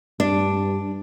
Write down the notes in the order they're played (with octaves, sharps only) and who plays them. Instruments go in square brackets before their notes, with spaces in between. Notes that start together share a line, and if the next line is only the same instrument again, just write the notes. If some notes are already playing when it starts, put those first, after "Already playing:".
[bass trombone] G2 [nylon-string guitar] D4